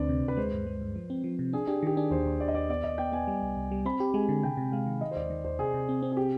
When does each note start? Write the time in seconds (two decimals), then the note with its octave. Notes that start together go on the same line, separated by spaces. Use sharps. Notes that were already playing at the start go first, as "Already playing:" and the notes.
Already playing: D2 C4 D4 B4 D5
0.09 C3
0.23 D2
0.28 B4
0.37 G#3 C5
0.53 G2
0.67 G#3
0.82 G2
0.96 F3
1.10 C4
1.24 F3
1.39 C3
1.53 D4 G#4
1.67 D4 G4
1.83 D#3 G4
1.96 D4 G#4
2.11 D#2 C5
2.26 D#2
2.40 D#2 D5
2.48 D#5
2.54 D#2 D5
2.69 B3 D5
2.84 D#2 D#5
2.98 B3 G5
3.12 B3 G#5
3.28 G3
3.42 C2
3.56 C2
3.71 G3
3.85 C4 B5
4.00 G4
4.14 G#3 G#5
4.29 D3
4.43 C3 G5
4.57 C3
4.72 G#3 F5
4.86 D#3
5.01 D#3 D#5
5.11 C5
5.16 D#2 D5
5.30 D#3
5.45 D#2 C5
5.59 C3 G#4
5.74 C3
5.89 C4
6.02 C4
6.12 G#4
6.17 G4